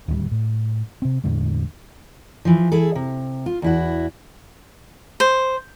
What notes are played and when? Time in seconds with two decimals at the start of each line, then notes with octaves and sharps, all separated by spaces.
0.08 D1 D#2 D3 G3
0.31 A2
1.02 C3 C4
1.24 E2 A2 D3 G#3
2.45 E3 F3
2.72 E4 G#4 A4
2.95 C3
3.46 F4
3.62 E2 E4 F#4
5.20 C5